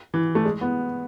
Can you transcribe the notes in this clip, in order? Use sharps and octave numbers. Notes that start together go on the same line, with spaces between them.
E3
A3
G#3
B3